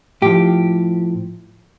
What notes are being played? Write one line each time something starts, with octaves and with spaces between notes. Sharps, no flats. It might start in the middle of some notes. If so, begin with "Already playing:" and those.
A2 F3 G4